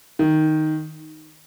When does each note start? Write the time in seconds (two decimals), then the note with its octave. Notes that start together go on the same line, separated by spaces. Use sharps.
0.19 D#3